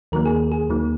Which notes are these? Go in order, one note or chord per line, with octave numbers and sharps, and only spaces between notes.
D#2 D#3 F#3 A#3 A#4
G#4
G#4
D#2 D#3 F#3 A#3